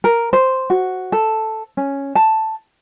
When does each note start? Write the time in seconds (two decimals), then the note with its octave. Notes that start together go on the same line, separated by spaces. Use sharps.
0.04 A#4
0.33 C5
0.70 F#4
1.12 A4
1.77 C#4
2.15 A5